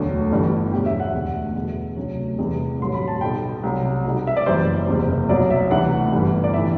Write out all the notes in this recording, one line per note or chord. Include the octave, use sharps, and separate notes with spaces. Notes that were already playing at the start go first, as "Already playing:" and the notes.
Already playing: E1 D2 D3 F#3
G1 G2 E3 G3
E2 B2 F#3 G4
E5
F#5
E1 D2 D3
E2 B2 G3
D2 C3 F#3
E2 C3 E3 G3
A1 G2 D3 F#3 C6
B5
A5
B1 B2 G3 G5
C2 C3 F#3
B1 B2 G3
E5
D5
F#1 F#2 E3 G3 C5
F#1 E2 C3
C2 B2 F#3 D5
E5
D2 C3 E3 G3 F#5
G1 G2 E3 G3
D5
A2 E3 E5